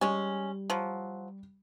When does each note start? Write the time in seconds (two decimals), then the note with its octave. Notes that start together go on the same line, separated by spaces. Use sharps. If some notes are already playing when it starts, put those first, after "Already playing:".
0.01 G3 G#3 C#4
0.70 F3 F#3